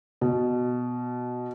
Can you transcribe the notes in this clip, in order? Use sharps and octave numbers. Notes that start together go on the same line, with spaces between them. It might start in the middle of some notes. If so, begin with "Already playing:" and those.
B2